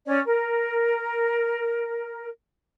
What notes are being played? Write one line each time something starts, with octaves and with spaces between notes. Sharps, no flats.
C#4 C#5 D5
A#4